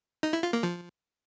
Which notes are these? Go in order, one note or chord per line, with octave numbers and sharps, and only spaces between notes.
D#4
E4
F4
A#3
F3